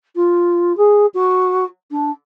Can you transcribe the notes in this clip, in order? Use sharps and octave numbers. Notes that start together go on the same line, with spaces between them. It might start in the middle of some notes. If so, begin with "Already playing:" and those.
F4
G#4
F#4
D4